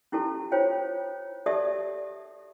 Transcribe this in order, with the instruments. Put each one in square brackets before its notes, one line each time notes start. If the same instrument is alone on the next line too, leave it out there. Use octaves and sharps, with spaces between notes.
[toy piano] C#4 E4 G4 A4 A5
F4 C5 C#5 G5
G4 A4 D5 E5 A5 D#6